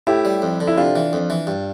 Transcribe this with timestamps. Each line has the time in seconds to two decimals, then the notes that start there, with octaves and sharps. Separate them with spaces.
0.07 A2 E4 G4
0.25 G3
0.42 F2
0.60 D3
0.67 E4
0.77 C3 D4 F4
0.95 E3
1.13 F2
1.30 E3
1.47 G2